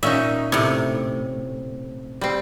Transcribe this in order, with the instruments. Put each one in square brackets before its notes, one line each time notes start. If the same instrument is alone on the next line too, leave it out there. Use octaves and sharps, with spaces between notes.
[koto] A#2 C#4 D#4 [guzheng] E5
[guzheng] A2 C3
[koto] G3 C4